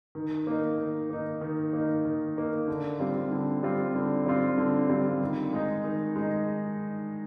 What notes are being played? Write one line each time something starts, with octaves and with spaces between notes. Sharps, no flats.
D#3
A#3 D#4
D#3
A#3 D#4
D#3
A#3 D#4
D#3
A#3 D#4
D3
G3 C4 F4
D3
G3 C4 F4
D3
G3 C4 F4
D3
G3 C4 F4
D#3
G#3 D#4
D#3
G#3 D#4